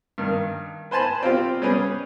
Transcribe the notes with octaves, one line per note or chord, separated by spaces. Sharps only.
G2 D#3
B4 C5 G#5 A5 B5
C4 F4 G4
G3 C#4 G#4 B4